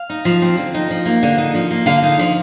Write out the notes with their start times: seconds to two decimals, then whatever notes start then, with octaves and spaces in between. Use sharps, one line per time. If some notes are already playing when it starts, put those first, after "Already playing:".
Already playing: F5
0.10 D#4
0.25 F3
0.42 C4
0.57 D3
0.75 D#4
0.90 F3
1.06 A#3
1.23 D3
1.38 D#4
1.55 F3
1.71 A#3
1.86 D3 F5
2.03 D#4
2.19 F3